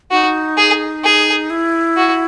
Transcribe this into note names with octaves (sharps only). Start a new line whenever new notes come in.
D#4 F#4
G#4
G#4
E4
F#4